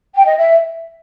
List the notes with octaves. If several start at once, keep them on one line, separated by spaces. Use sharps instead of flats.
G5
D#5
E5